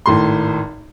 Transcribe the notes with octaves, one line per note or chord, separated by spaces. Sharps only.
G#1 A2 C6